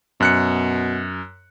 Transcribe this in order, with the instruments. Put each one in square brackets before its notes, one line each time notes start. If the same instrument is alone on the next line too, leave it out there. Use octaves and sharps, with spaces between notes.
[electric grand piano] F#2 F#6 C#7 [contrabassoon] B2